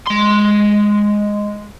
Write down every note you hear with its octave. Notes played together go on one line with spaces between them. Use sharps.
G#3 C6